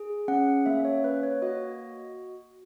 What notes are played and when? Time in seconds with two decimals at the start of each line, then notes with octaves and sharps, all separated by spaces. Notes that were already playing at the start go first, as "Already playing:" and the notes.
Already playing: G#4
0.28 C#4 F#5
0.66 A#3 E5
0.85 C#5
1.04 A#3 B4
1.23 C#5
1.42 F#4 D#5